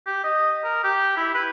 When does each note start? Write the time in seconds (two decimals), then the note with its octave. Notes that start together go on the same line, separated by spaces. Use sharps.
0.07 G4
0.24 D#5
0.64 A#4
0.84 G4
1.17 E4
1.34 B4